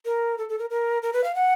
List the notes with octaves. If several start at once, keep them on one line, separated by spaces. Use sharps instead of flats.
A#4
A4
A4
A#4
A#4
A#4
B4
F5
F#5